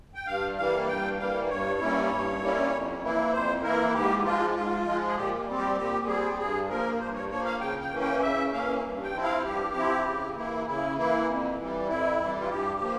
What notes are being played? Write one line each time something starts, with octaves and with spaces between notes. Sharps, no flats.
G5
G2 F5
E3 G3 A#3 F5
G2 G5
E3 G3 A#3 F5
G2 C#5
G3 A#3 C#4 E4
G2
G3 A#3 C#4 E4
F2
E3 A#3 E4
F2 C5
E3 A#3 E4 A#4
G#2 G4
F3 G#3 F4
G#2 F4
F3 G#3
G#4
A#2 G4
G3 C4
G4
A#2 G4
G3 C4 G#4
G2 G#4
F3 A#3 A#4
G2 C5
C#5
F3 A#3 C#5
F5
C#3 G5
G5
E3 A#3 C#4
G5
C#3 E5
E3 A#3 C#4 F5
G2
G5
F3 C4 E4
F5
G2 G4
F3 C4 E4
C#3
E3 A#3 E4
C#3 E4
E3 A#3 E4
F2
E3 G3
F2 E4
E3
G3
F4
G2 G4
F3 A#3